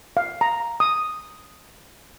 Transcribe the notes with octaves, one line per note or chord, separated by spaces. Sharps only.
F5
A#5
D#6